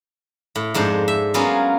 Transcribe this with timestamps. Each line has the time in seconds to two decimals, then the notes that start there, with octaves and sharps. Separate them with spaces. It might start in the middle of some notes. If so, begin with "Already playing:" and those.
0.55 A2
0.74 F2 G#2 D4 C5
1.08 E5
1.34 F#3 A#3 B3 C#4 F4 G#4